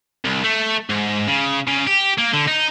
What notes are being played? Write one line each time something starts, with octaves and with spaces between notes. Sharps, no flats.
C2
A3
G#2
C#3
C#3
G4
A#3
D3
D#4